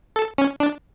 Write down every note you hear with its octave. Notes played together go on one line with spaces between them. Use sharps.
A4
C#4
D4